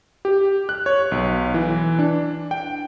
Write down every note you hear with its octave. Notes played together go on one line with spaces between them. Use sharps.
G4
F#6
C#5
B1
E3
D4
G5